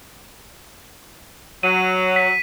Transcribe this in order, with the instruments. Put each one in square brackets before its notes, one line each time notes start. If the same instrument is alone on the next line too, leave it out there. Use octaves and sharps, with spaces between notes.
[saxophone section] F#3 [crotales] D#7
[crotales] B6